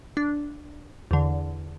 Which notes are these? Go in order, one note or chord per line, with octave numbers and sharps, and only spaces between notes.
D4
E2 D3